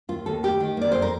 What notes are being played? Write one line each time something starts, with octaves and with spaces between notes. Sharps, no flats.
D#2 F4
D#2 A4
A3 G4
D#3
A#3 D5
F2 C5
A#4